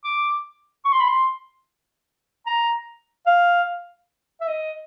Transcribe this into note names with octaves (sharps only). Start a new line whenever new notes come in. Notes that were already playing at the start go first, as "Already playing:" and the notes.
D6
C#6
C6
B5
C6
A#5
F5
E5
D#5